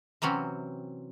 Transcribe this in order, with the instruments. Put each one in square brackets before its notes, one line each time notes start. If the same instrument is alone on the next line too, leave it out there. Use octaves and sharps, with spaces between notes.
[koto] C3 E3 F#3 C4 C#4